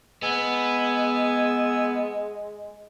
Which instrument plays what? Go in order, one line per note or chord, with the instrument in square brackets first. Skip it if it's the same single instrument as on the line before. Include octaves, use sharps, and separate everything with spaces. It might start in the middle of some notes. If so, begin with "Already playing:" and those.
[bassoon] G#3 [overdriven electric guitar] B3 [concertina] G#5 E6